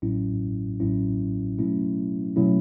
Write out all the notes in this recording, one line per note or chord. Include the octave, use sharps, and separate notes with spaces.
A1 A2 F#3 C#4 E4
A1 A2 F#3 C#4 E4
B2 F#3 A3 C#4 E4
B2 F#3 A3 C#4 E4